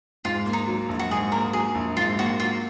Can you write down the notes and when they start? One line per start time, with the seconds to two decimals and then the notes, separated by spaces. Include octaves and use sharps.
0.25 G#2 F4
0.46 A#3
0.53 D#4
0.68 F#3
0.89 A#1
0.99 F#4
1.11 G#2 G#4
1.32 A#3 A#4
1.53 F#3 G#4
1.75 A#1
1.97 G#2 F4
2.19 A#3 F#4
2.40 F#3 F4